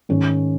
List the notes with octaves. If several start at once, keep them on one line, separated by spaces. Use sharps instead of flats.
G#2 D#3 C#4